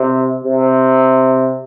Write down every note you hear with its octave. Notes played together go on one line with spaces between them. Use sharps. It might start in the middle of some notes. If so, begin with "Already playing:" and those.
Already playing: C3
C3